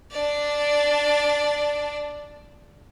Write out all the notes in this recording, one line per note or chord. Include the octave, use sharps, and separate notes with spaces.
D4 D5